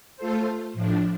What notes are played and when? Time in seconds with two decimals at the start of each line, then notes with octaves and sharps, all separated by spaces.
0.17 A3 F4 A4 C5
0.74 A2 F3 D4